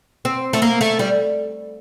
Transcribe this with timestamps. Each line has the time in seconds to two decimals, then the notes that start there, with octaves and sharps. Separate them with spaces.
0.25 C4
0.53 A3
0.62 A#3
0.81 A3
0.99 G3